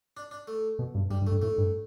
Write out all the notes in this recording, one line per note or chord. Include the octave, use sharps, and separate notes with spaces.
D4
D4
A3
B2
G2
G2 G3
G2
A3
G2
A2 A3
G2